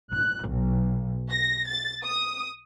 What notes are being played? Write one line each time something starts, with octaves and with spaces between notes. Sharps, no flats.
F#6
B1
A#6
A6
D#6